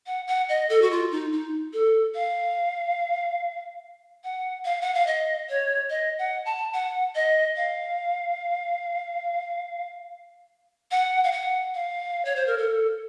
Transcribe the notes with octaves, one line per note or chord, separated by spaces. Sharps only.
F#5
F#5
D#5
A4
F#4
F4
D#4
D#4
A4
F5
F#5
F5
F#5
F5
D#5
C#5
D#5
F#5
A5
F#5
D#5
F5
F#5
F5
F#5
F5
C#5
C5
A#4
A4